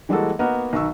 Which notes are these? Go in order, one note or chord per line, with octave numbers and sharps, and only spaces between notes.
E3 G3 G#3 A#3 F#4 A4
A#3 B3 D#4 F#4 A#4
B1 D#3 C#6 E6